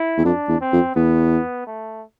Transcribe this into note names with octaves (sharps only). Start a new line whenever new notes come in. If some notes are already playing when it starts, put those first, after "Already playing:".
Already playing: E4
E2
F2 D4
E2
C4
F2
E2 B3
A3